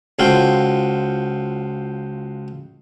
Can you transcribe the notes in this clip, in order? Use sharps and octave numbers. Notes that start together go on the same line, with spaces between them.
C#2 F4 F#4 A4 C5 G5